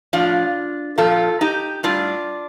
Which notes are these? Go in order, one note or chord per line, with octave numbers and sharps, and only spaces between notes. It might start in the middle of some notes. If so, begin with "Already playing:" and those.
A2 F3 D4 F4
A#2 F3 F4 A4
D#4 G4
A2 G3 D4 F4